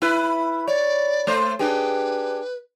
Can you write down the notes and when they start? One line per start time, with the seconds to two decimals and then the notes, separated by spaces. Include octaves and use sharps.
0.02 E4 B4
0.68 C#5 D5
1.27 A3 C5
1.59 D4 G4 G#4 B4